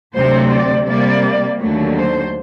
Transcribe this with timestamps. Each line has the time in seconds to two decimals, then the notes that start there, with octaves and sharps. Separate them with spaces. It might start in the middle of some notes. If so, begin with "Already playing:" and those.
0.15 D2 C3 F#3 C4 C5
0.51 D5
0.88 C3 G3 A#3 D5
1.60 D#2 D3 F#3 A3
1.96 C5